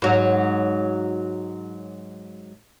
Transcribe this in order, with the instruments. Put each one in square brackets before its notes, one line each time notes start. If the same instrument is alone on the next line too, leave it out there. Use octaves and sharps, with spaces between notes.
[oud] G#2 F#3